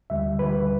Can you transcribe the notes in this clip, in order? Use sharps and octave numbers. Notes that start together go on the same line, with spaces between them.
D2 D3 G3 E5
D2 D3 G3 B4